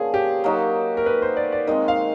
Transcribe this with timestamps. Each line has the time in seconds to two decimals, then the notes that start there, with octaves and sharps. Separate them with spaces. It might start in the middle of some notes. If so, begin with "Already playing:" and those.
Already playing: D3 F3 A#3 C#4 G#4
0.14 G4
0.44 F#3 A#3 D#4 F#4
0.97 A#4
1.06 B4
1.22 C5
1.37 D5
1.52 D5
1.67 D#3 G#3 C4 D#5
1.88 F5